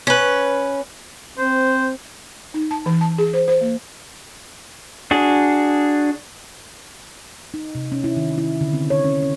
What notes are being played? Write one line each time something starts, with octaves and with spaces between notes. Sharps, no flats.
C#4 B4
C4 C5
D#4
A5
E3
A5
G#4
C5
C5
A#3
D4 F#4 G#4
D#4
C3
C#4
E4
D#3
E4
D3
C4
C#5
C#4
C#4